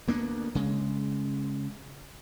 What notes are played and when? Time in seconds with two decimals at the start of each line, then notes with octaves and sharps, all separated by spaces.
0.08 D2 A#3 B3 D4
0.55 C#3 G#3